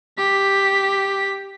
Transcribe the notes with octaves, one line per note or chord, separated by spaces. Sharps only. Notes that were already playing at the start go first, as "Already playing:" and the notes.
G4 B6